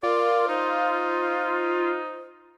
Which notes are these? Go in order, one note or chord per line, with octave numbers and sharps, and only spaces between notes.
F4 A#4 D5
D#4 C5